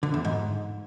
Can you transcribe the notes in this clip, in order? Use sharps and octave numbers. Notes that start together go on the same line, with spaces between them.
D3
E2
G#2